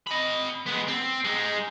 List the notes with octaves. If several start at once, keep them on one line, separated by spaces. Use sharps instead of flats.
D#5 B5
G#3 B3
C4
G#3 D#4